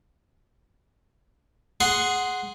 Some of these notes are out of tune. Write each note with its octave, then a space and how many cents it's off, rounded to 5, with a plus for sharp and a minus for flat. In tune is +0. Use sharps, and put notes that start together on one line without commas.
G#4 +0 F#5 +0 C6 +0